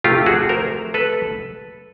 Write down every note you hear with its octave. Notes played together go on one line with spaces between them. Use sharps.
C3 F3 A3 F4 G4
F#4 G#4
A#4 C5
A4 B4